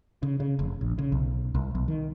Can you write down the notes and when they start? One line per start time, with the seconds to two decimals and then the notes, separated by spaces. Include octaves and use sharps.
0.23 C#3
0.40 C#3
0.59 F1
0.81 A#1
0.99 C#3
1.12 B1
1.55 C2
1.75 B1
1.88 D#3